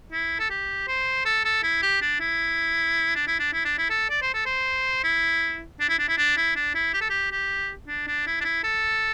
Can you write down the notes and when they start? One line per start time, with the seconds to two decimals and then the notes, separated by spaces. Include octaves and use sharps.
0.12 E4
0.39 A4
0.50 G4
0.88 C5
1.26 A4
1.45 A4
1.63 E4
1.82 G4
2.02 D4
2.21 E4
3.15 D4
3.27 E4
3.39 D4
3.53 E4
3.65 D4
3.78 E4
3.90 A4
4.10 D5
4.22 C5
4.34 A4
4.46 C5
5.04 E4
5.80 D4
5.89 E4
5.99 D4
6.08 E4
6.18 D4
6.37 E4
6.55 D4
6.75 E4
6.94 G4
7.01 A4
7.10 G4
7.32 G4
7.88 D4
8.08 D4
8.27 E4
8.41 D4
8.44 E4
8.64 A4